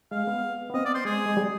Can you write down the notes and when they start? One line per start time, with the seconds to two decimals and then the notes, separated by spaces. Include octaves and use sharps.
0.11 G#3 F5
0.27 B3
0.70 B3
0.74 C4 D#5
0.85 D5
0.94 C5
1.05 G#3 G#4
1.26 G#3
1.37 G3